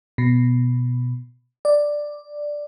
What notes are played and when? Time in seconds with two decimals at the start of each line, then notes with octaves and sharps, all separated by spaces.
0.18 B2
1.65 D5